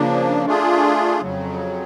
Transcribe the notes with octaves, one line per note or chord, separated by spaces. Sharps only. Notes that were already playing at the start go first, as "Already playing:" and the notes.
Already playing: C#3 F3 A#3 D4
A3 D4 F4 G#4
F2 C#3 F#3